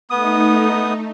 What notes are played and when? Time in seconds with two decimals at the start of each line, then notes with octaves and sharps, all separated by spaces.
0.10 A3 B3 D#4 D#6